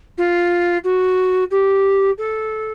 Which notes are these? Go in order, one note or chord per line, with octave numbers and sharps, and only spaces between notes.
F4
F#4
G4
A4